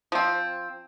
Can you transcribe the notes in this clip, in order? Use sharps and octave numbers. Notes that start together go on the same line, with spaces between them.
F3 C4